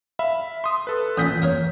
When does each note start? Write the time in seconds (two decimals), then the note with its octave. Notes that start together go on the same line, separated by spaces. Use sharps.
0.19 E5 F5 B5
0.64 C6 D#6
0.87 A4 B4
1.17 A1 A#2 F#5 D#6 G6 B6
1.42 A#3 A#4 C#5